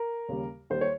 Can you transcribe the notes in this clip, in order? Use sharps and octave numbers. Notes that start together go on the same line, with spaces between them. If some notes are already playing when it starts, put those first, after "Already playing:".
Already playing: A#4
D#2 C#3 G3
D#2 D#3 G3 C5
C#5